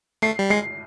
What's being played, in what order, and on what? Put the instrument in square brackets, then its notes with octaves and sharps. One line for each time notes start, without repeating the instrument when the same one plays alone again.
[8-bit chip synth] A3 [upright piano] C7
[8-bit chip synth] G3
[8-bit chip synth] G#3 [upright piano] C7